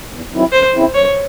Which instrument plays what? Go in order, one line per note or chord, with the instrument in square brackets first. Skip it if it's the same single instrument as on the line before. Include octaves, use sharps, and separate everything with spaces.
[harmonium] E2
D#3 F#3 C4 E4
[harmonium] F#2 [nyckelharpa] C5
[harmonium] C#3 E3 C4 E4
[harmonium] F#2 [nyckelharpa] C#5